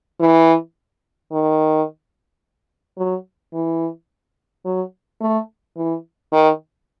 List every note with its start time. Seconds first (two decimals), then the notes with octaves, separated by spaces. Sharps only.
0.20 E3
1.32 D#3
2.98 F#3
3.54 E3
4.65 F#3
5.21 A3
5.77 E3
6.32 D#3